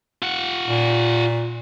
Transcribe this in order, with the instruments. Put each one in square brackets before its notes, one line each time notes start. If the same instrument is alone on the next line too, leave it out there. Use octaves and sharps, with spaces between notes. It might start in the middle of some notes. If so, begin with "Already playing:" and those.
[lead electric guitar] F4 F#5
[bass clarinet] A#2